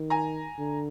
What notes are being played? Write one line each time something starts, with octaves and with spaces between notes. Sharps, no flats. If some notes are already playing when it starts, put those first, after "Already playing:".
Already playing: D#3
G#5 A#5
D3